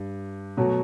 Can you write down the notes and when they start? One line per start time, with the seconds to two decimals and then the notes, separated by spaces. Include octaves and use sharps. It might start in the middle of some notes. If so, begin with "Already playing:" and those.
Already playing: G2
0.57 B2 F#3 A3